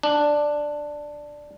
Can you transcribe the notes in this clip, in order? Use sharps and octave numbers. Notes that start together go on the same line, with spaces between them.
D4